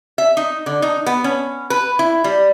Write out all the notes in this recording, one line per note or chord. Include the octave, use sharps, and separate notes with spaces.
E5
D#4
D3
D#4
B3
C#4
B4
E4
G3